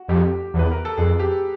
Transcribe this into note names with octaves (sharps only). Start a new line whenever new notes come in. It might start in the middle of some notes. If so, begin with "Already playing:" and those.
Already playing: F#4
F2 G4
E2
B4
A#4
A4
F2 G#4
G4